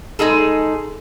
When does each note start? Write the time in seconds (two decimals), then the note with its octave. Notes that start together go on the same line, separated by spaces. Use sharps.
0.19 G#3 D#4 G#4 A4